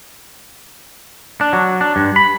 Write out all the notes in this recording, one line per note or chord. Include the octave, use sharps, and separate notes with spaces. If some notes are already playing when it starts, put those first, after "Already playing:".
D4
F#3
D4
G2
B5